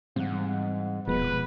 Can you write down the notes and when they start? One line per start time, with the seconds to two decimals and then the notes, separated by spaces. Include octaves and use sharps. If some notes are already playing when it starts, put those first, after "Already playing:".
0.16 G#2 E3 G3 C4 F5 F#5
1.08 D#1 B2 F3 G#3 B3 B4